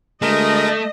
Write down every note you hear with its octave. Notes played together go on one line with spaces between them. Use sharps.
D2 G#3 A3 A#4 D#5